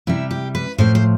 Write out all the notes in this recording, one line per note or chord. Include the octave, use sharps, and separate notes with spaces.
C3 G3 E4
G4
B4
A2 F3 C5
C5